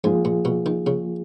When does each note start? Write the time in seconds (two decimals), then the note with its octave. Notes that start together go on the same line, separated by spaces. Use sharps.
0.04 G#2 F3 A#3 F4 G#4
0.25 A#2
0.45 B2
0.66 D#3
0.87 C#3